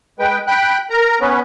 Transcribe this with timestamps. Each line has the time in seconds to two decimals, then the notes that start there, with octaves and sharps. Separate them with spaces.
0.19 G#3 B4 G5
0.47 G5 B5 F#6
0.90 A#4 A#5
1.21 B3 C#4 B4